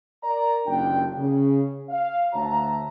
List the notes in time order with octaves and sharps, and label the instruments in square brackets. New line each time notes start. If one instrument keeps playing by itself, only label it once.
[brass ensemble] A#4 D5 A#5
F#1 D#2 D4 F4 G5
C#3
F5
D2 F#4 C#5 E5 A5 A#5